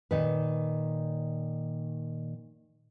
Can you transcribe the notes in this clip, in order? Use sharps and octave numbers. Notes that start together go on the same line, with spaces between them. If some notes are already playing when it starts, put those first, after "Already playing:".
A#2 D#3 B4